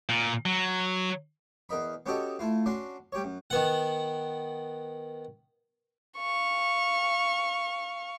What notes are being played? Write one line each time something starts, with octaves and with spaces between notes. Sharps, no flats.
A#2
F#3
E2 A#4 D#5 B5
B3 C#4 F#4 G4 A4 D#5
A3 E4 F4
C#4 D4 F#4 C6
G3 G4 C#5
F#2
D#3 B3 F#5
F5 C#6